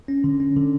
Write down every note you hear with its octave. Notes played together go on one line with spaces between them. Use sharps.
C#4
D3
C#4
D3